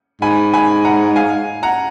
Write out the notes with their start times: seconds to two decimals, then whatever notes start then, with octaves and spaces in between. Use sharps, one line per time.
0.22 G#2 G#5 B5
0.54 G#5 B5
0.85 F#5 A#5
1.16 F5 G#5
1.63 F#5 A#5